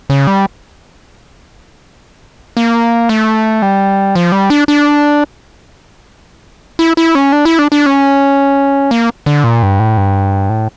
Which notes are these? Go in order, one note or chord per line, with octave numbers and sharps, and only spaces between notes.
C#3
G3
A#3
A3
G3
F3
G3
D4
D4
E4
E4
C#4
D4
E4
D4
D4
C#4
A#3
D3
A#2
G2
A2
G2
A2